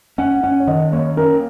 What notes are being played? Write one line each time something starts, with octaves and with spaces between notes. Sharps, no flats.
C#4 F#5
C#4 F#5
C#5
D#3 D#5
A#3 C#5
C#4 A#4